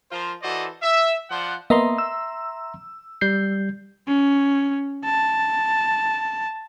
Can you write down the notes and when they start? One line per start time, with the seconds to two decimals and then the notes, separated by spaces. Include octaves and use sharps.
0.11 F3 F4 A#4 C5
0.43 E3 F#4 A4 C5 D5 D#5
0.82 E5
1.30 F3 C5 D5 F#5
1.70 A#3 B3 D#5 E5 A#5 C6
1.98 E6
3.21 G3 G6 C7
4.08 C#4
5.05 A5